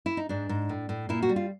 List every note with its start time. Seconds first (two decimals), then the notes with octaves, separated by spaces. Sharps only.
0.06 E4
0.17 D#4
0.29 G#2 D4
0.49 G#2
0.69 A2
0.89 A2
1.09 A#2 E4
1.22 F#4
1.29 G3
1.36 F4